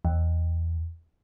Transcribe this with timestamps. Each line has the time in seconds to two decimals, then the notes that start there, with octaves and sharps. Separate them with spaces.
0.05 E2